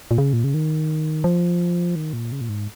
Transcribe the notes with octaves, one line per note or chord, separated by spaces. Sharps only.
A#2
C#3
A#2
C#3
D#3
F3
D#3
A#2
C#3
A#2
G#2